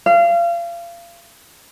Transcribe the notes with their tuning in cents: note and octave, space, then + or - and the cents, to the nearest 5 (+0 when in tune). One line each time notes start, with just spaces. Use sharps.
F5 -30